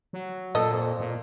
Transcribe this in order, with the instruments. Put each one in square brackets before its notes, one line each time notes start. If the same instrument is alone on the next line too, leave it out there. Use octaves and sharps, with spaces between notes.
[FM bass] F#3
[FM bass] A#2 [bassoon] A4 [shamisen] D#5
[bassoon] F2
[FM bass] A#2